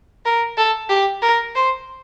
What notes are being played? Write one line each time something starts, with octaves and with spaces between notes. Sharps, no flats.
A#4
A4
G4
A#4
C5